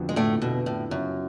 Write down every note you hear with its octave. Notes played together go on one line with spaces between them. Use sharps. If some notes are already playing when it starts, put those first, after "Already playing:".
Already playing: F2 D3 F3 B3 F#4
G#3
A2 A3
B2
A2
F#2 C#3 F#3 B3 F4